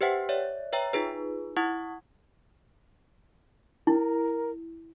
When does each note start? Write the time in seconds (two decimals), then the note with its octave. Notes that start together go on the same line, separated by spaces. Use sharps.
0.01 G4 B4 C5 E5 F#5 G5
0.29 C#5 D5 E5
0.73 B4 C#5 E5 G5 A#5
0.93 D#4 F4 G#4 B4
1.57 E4 F#5 C#6 D#6 G#6
3.87 E4 A#4